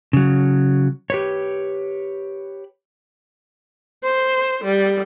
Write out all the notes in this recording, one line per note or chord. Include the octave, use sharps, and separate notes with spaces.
C#3 F#3
G4 B4 C#5
C5
G3